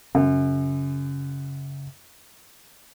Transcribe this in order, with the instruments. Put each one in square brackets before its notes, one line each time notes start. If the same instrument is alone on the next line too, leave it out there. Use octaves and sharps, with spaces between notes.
[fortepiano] F#2 [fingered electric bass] C#3